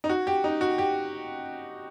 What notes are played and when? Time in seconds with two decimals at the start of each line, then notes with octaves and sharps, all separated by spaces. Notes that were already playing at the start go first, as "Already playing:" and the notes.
0.04 D#4
0.09 F#4
0.27 G4
0.44 D#4
0.61 F#4
0.78 G4